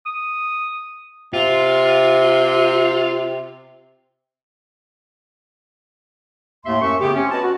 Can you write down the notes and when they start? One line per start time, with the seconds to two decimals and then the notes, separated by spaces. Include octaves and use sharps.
0.06 D#6
1.34 C3 F4
6.66 D#2 A2 A3 A#3 E5 C6
6.81 F#2 E5 C#6
7.00 C#3 A3 B3 G4
7.15 C4 C#4
7.31 F#4 B4 D#5 A5
7.43 F#4